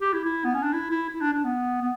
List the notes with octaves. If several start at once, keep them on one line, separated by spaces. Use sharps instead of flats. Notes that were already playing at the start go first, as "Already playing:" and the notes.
G4
E4
E4
B3
C#4
D4
E4
E4
E4
D4
D4
B3
B3